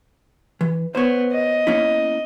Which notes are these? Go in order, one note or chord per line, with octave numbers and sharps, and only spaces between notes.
E3
B3 C5 C#5
D#5
A#3 C#4 E4